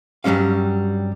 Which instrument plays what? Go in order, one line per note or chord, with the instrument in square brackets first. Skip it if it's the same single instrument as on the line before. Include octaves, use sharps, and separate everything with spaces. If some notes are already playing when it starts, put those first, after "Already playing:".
[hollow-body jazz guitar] G2 F#3 G3 C#4 F5